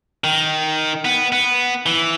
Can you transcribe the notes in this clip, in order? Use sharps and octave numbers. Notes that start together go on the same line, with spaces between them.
D#3
B3
B3
E3